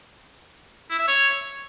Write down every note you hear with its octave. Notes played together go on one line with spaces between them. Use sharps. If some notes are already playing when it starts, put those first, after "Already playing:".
E4
E5
C#5